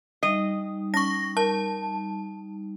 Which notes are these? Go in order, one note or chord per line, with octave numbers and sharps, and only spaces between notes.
G3 D#4 D#5
C#4 C#6 A#6
A#4 A5